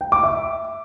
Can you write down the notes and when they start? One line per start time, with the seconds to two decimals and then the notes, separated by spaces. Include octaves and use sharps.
0.01 G5
0.12 D6
0.23 E5